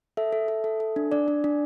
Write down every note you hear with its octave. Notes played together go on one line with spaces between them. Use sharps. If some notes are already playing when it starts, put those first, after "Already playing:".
A4 E5
A4
A4
A4
A4
D4
D4 D5
D4
D4